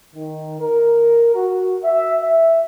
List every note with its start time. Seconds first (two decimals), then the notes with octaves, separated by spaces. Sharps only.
0.15 D#3
0.60 A#4
1.35 F#4
1.84 E5
2.21 E5